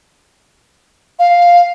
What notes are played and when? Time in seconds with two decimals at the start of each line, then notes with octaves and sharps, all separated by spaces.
1.19 F5